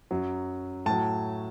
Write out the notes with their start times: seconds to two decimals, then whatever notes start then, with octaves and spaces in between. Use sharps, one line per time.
0.11 F#2 F#3
0.86 A2 F#3 A5